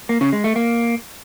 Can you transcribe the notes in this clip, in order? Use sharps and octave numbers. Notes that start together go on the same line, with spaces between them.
A#3
C#3
G#3
A3
A#3